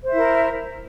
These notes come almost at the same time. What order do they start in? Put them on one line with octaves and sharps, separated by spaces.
C5 E5 E4 A#4